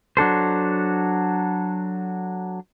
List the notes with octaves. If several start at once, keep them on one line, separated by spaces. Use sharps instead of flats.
F#3 D4 A4 C5